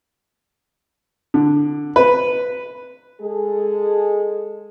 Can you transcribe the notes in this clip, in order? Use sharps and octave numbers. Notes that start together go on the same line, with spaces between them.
D3
B4
G#3 G#4 A4